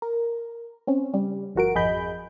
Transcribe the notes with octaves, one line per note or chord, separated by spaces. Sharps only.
A#4
C4 C#4
C#3 G3
G1 F3 F#4 A#4 D7
G#1 F2 G#4 D#5 B5 G6